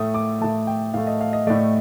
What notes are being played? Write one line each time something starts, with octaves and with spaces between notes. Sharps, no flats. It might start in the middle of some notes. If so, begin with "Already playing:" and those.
Already playing: A2 A3 D#6
D6
A2 A3 A5
G5
A2 A3 F5
D#5
F5
D#5
A2 A3 D5